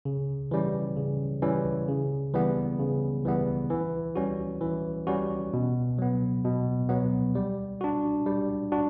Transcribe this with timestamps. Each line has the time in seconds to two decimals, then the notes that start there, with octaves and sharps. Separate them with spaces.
0.05 C#3
0.51 E3 G3 C#4
0.97 C#3
1.42 E3 G3 C#4
1.88 C#3
2.34 E3 G3 B3
2.79 C#3
3.25 E3 G3 B3
3.70 E3
4.16 G3 C#4 F#4
4.61 E3
5.07 G3 C#4 F#4
5.53 B2
5.98 F#3 B3
6.45 B2
6.89 F#3 B3
7.35 G3
7.81 D4 F#4
8.26 G3
8.72 D4 F#4